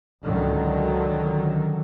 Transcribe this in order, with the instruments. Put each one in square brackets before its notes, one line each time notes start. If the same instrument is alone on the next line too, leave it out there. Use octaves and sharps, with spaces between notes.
[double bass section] C#2 D3 D#3 F#3